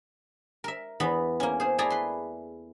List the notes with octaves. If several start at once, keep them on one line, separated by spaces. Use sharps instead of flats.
A#4 E5
E2 E3 B3 B5
A#3 C#4
G#4 C5
A3 E4 G#4 D5 A#5
B4 C6